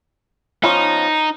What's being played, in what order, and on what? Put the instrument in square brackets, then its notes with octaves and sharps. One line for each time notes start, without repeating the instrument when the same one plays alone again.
[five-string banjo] F3 B3 C#4 [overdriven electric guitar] D#4